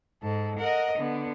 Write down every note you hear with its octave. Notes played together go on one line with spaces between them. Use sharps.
G#2 A4
A#4 D#5 F#5
D3 B3